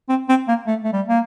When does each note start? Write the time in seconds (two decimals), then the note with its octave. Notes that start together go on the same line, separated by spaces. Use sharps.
0.09 C4
0.29 C4
0.48 A#3
0.66 A3
0.84 A3
0.93 G3
1.08 A#3